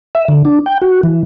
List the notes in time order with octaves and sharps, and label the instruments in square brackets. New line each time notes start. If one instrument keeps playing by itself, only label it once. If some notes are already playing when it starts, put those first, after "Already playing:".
[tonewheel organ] E5
D3
D4
G5
F#4
E3